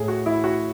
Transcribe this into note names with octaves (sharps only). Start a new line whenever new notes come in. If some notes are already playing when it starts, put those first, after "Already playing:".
Already playing: A2 G#4
F#4
E3 E4
F#4